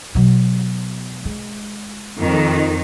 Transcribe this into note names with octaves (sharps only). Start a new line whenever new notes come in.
B2 F#3
G#3
F2 D#3